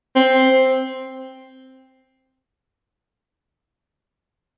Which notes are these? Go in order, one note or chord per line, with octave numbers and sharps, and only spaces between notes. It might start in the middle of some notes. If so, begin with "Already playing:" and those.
C4